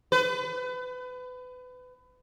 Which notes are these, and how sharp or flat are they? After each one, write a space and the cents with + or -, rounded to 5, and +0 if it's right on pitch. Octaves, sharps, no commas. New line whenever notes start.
B4 +30